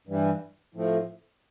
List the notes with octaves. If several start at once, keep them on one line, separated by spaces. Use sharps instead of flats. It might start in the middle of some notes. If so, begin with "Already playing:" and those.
G2 E3 G3
A2 F3 A3 C4